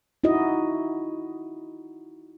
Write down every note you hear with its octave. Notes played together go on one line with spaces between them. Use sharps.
D#4 E4 F#4 D#5